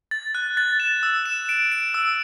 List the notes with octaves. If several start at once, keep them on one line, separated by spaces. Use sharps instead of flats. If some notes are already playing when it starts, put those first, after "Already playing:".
A6
F#6
A6
E7
E6
E7
D7
D7
E6